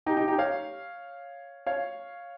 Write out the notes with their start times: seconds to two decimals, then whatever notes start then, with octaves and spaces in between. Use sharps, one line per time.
0.06 D#4 G4
0.17 D#4 G4
0.28 D#4 G4
0.38 C#5 F5
1.66 C#5 F5